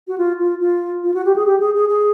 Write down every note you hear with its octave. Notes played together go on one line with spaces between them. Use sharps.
F#4
F4
F4
F4
F4
F#4
G4
G#4
G4
G#4
G#4
G#4